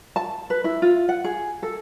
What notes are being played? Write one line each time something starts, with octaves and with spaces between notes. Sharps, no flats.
A5
B4
E4
F4
F#5
G#4
A4